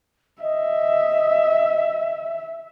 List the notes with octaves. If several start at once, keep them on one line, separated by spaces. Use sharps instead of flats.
D#5 E5